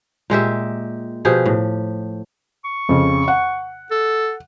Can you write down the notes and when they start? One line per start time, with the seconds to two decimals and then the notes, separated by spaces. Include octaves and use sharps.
0.30 A#2 G#3 G4 E5
1.25 B2 F3 G4 G#4
1.46 A2
2.65 C#6
2.89 F2 C#3
3.28 F#5
3.91 A4